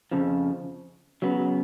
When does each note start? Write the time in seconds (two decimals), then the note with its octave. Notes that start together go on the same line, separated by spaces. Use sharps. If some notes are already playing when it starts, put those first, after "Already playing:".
0.11 F2 C#3 F3
1.22 C#3 F#3 B3